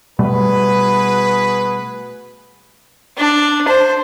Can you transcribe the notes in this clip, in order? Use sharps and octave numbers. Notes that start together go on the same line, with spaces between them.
B2 G3 A3 F#4 G#4 B4
D4
C5